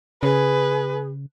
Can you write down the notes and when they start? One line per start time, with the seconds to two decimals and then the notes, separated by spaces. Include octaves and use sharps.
0.23 C#3 G#4 B4